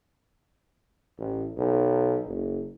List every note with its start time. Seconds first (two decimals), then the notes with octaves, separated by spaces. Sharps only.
1.19 A1
1.58 B1
2.26 F#1